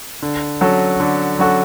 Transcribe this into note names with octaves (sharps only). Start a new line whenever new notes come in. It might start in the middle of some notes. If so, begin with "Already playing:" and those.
D3
F#3 C#4 F#4 A4
D3
F#3 C#4 F#4 A4